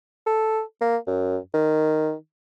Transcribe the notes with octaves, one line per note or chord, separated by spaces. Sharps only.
A4
A#3
F#2
D#3